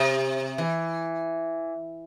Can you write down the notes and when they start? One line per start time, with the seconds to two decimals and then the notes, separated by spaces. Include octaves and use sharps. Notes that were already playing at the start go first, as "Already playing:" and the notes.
Already playing: C3
0.58 E3